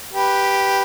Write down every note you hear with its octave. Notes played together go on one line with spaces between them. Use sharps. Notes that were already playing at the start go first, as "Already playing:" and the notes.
G4 B4